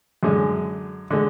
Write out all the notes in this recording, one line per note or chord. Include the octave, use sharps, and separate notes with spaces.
F#2 D3 G#3
D3 G#3